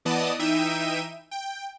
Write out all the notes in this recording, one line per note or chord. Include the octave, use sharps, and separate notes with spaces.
E3 B3 D5 D#5 A5 D#6
E3 D#4 E5 G5 D#7
G5